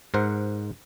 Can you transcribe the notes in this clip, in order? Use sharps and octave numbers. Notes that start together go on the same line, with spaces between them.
G#2 A#4 C5 F#5